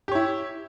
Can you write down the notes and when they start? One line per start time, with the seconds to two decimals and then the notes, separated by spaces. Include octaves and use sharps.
0.08 G4
0.12 C#5
0.15 E4